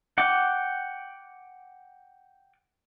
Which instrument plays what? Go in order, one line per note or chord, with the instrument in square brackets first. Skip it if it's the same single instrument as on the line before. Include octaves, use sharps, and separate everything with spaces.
[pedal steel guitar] F#5 G5 D6